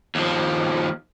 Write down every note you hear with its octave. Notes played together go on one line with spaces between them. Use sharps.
D#2 F3